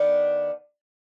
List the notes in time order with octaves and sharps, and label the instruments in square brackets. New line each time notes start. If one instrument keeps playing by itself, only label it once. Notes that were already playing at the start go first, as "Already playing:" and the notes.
Already playing: [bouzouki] D#3 B3 D4